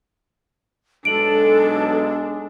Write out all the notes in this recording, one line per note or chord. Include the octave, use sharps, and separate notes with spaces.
B1 G#3 D4 A4 D7 F#7